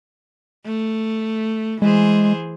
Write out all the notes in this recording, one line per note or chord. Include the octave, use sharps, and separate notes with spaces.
A3
E3 G#3 G#4 C5